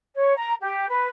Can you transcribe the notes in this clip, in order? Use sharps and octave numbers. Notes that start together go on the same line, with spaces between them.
C#5
A#5
G4
B4